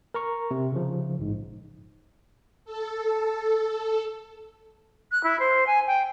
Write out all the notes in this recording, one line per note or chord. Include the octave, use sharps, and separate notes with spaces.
A#4 A#5 C#6
C3
C#3 F3
A1 G#2
A4
F#6
E4
C5
G#5
G5